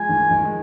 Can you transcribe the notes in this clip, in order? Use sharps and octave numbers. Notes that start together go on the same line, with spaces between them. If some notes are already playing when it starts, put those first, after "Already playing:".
Already playing: F3 G#3 G#5
D#3
D#3
G#3